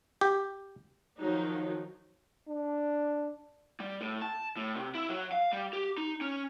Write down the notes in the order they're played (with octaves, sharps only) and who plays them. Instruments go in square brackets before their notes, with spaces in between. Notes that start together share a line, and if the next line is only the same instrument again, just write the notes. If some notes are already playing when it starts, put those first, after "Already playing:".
[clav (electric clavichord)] G4
[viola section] D#3 F3 F#3 D#4
[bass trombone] D4
[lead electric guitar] G3
A2
A5
A2
C3
E4
F#3
F5
G3
G4
D#4
C#4